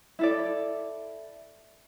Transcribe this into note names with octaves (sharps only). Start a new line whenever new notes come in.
E4 A4 D5